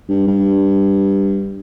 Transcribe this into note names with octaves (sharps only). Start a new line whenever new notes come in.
G2
G2